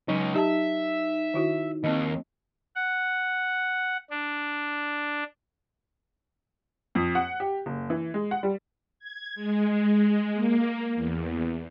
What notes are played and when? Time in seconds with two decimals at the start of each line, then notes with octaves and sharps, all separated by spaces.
0.08 C#2 F#3 C#4 D#4 C#5
0.35 D#4 G4 E5 A5
1.34 D#3 E4 F#4
1.84 D#2 C4 D#5
2.76 F#5
4.10 D4
6.95 F2
7.15 F#5
7.40 G4
7.66 F#1
7.90 E3
8.14 G#3
8.31 F#5
8.43 G3
8.99 G#6
9.35 G#3
10.34 A#3
10.95 E2